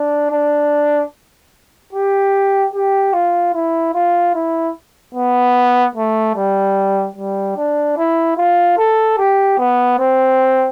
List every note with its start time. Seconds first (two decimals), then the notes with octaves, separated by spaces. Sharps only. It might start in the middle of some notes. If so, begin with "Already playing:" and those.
Already playing: D4
0.31 D4
1.93 G4
2.74 G4
3.13 F4
3.54 E4
3.94 F4
4.34 E4
5.15 B3
5.96 A3
6.36 G3
7.17 G3
7.57 D4
7.97 E4
8.37 F4
8.78 A4
9.18 G4
9.58 B3
9.99 C4